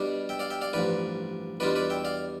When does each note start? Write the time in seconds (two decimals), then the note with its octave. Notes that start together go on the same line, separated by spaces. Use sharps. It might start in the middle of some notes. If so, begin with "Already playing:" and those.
Already playing: B2 G3 D4 D5 F5
0.29 E5 G5
0.39 D5 F5
0.50 E5 G5
0.61 D5 F5
0.73 A1 G2 F3 B4 D5
1.60 E2 B2 G3 D4 F4 B4 D5
1.75 B4 D5
1.90 E5 G5
2.05 D5 F5